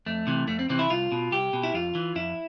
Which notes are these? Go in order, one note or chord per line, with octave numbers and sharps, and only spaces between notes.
F2 A3
C3 E3
F2 A3
C4
C3 E3 C4
E4
C2 F4
B2
C2 G4
B2
E4
F2 F4
E3
F2 E4